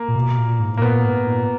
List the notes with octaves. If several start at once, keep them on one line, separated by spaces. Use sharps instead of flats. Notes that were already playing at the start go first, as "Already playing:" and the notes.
Already playing: A#3
A#2
B2
A#2
G#2
A2
A#3
A#2 B3
G#2
A#2